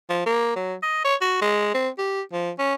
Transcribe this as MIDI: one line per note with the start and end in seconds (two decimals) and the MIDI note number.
0.10 0.21 53
0.26 0.56 58
0.56 0.75 54
0.83 1.04 75
1.05 1.15 73
1.21 1.41 66
1.41 1.72 56
1.74 1.89 60
1.98 2.22 67
2.32 2.51 53
2.59 2.74 61